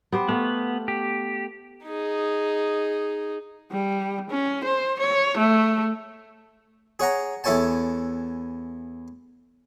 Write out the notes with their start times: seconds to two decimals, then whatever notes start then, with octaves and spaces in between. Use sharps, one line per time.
0.12 B3 G4 C5
0.29 A3 B3 F5
0.88 G4
1.85 D#4 G#4
3.71 G3
4.30 C#4
4.65 C5
5.00 C#5
5.38 A3
6.99 G#4 C#5 F#5 A#5
7.44 E2 E4 A4 C#5 G#5 A5